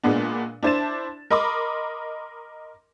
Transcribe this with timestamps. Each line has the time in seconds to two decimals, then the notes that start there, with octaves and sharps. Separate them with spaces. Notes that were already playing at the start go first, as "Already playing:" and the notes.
0.03 A#2 G#3 B3 D4
0.63 D4 E4 C5 A5 A6 E7
1.31 A#4 D#5 B5 C6 D6